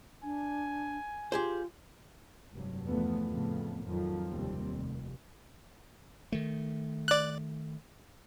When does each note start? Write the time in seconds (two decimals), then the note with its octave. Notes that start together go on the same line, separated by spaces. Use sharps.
0.23 D4 G#5
1.32 F4 G4 G#4 C5
2.53 F1 G2 F#3
2.87 E2 D3 F3 A3 B3
3.28 F2 A2 C#3 A3 B3
3.84 F2 D#3 F3 F#3
4.30 F#1 D#2 C3 G3 C4
4.66 F1
6.32 D#3 A3
7.08 D5 F#6